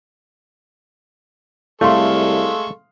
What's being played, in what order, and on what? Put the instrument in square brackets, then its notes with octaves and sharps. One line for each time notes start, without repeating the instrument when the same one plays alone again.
[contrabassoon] C2 [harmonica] G#3 A4 C#6 [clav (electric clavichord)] A3 [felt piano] F5 C6